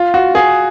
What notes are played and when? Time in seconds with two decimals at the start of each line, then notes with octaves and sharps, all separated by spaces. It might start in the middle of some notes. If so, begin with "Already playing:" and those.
Already playing: F4
0.14 F#4
0.35 G#4